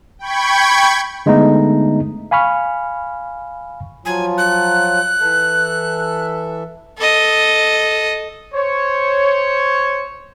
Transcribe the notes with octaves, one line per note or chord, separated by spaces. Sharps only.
G5 B5 C#6 G#6
D3 G#3 A3 B3 D#4
F5 G#5 B5 C#6 F6
F3 F#3 F4 G#5
F#6
E3 A4 E5
A4 D#5
C5 C#5